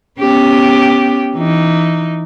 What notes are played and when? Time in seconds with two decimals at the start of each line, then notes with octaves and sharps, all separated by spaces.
0.20 B3 C#4 G4
1.35 E3 D#4